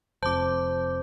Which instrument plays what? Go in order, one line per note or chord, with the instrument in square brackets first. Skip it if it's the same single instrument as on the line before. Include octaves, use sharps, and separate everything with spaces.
[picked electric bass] F1 F2 [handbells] C5 [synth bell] A5 D6